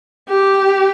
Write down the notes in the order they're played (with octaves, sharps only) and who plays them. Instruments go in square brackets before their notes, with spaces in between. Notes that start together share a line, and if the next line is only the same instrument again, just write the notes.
[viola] G4